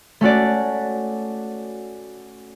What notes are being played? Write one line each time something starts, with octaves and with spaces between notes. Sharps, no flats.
A3 C#4 F#4 D5